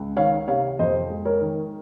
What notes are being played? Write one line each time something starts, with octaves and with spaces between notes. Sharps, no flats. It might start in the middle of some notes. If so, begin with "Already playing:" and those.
Already playing: C#2
D#3 C#5 F5
C3 C#5 F5
F2 C5 D#5
G#3
A#4 C#5
D#3